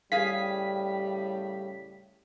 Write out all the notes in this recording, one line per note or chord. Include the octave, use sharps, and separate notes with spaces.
A2 C#3 G3 G#4 F5 B6